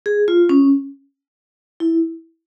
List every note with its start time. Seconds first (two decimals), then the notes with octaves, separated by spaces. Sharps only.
0.06 G#4
0.28 F4
0.49 C#4
1.80 E4